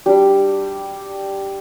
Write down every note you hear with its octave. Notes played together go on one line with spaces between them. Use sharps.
G3 D4 G4